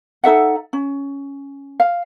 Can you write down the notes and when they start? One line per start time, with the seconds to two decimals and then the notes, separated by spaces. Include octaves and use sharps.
0.24 D#4 A4 E5 F#5
0.73 C#4
1.80 F5